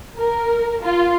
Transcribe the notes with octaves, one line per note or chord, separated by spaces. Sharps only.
A#4
F4